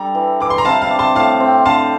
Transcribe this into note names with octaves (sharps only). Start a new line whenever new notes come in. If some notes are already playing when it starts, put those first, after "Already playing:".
Already playing: G3 D4 A4 A#5
E3
E3 D6
C6
A#5
C3 F5 A5
F5 A5
D4
A5 C6
A2 F5 A5
C4
D3 F5 A5